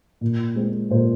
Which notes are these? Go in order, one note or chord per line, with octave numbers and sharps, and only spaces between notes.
A#2
G#3 C4
A#2 C5